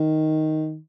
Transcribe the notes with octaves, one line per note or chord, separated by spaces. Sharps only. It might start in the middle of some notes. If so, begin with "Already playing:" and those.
Already playing: D#3